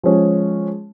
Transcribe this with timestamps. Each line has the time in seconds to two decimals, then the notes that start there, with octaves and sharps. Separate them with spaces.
0.03 F3 G#3 C#4 G#4